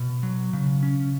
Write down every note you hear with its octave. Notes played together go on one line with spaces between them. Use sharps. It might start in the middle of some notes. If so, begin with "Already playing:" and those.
Already playing: B2
F#3
C#3
C#4